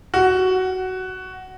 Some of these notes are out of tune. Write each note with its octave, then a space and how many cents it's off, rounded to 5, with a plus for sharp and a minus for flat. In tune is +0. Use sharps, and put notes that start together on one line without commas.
F#4 +10